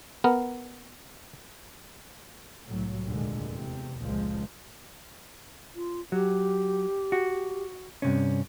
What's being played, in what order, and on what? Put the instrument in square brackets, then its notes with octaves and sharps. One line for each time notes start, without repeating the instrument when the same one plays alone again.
[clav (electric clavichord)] B3 A#4
[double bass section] C2 A2 F#3
F1 D#2 A#2 D3 G#3
E2 C3
F1 C#2 A#2 F3 G#3
[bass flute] F4
[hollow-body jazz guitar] F#3 [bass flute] G4
[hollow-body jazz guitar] F#4
G2 C3 C#4